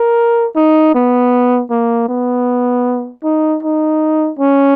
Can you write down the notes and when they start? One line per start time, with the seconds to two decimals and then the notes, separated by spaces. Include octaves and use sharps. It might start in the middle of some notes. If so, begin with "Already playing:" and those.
Already playing: A#4
0.56 D#4
0.95 B3
1.70 A#3
2.09 B3
3.23 D#4
3.63 D#4
4.39 C#4